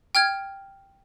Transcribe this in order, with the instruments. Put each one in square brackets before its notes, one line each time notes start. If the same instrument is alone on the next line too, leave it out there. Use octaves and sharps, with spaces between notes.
[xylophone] G5 F6 G#6